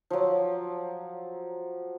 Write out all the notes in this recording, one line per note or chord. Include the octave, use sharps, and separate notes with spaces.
F3 F#3